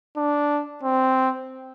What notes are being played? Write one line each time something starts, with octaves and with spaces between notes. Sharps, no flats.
D4
C4